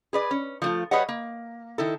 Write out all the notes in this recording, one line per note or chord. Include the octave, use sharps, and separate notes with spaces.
G#4 B4 D5
C#4
F3 A3 F4
G3 G#4 B4 C#5 D#5 F#5
A#3
D#3 E4 A4